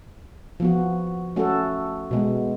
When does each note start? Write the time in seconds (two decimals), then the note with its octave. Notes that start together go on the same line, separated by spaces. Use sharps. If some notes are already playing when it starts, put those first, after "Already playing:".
0.60 F3 B3 F#4
1.36 A3 C#4 F#4 A4
2.11 B2 G#3 B3